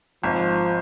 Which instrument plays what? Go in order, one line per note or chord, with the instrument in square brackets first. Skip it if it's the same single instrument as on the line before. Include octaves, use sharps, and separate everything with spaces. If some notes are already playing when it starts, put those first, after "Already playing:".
[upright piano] G#1 [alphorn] F3